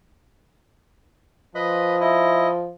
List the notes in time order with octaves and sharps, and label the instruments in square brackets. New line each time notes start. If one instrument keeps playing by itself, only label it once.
[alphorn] F3 [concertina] B4 D#5 B5
[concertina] E4 D#5